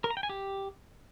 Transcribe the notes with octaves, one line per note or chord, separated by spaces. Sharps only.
A#4
A#5
G5
G#5
G4